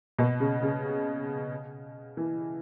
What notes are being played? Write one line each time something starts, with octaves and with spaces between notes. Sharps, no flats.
B2
C#3
C#3
E3